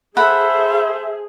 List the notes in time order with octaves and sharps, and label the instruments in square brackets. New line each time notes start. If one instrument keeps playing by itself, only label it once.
[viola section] G#4 [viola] A4 C5 [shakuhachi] E5 [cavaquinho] F#5 B5